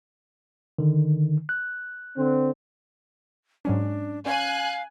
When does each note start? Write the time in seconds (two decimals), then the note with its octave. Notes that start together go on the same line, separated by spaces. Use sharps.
0.79 D3 D#3
1.49 F#6
2.17 D3 C4
3.65 G#2 F#3 C#4 D4
4.26 C#4 F5 G#5 F#6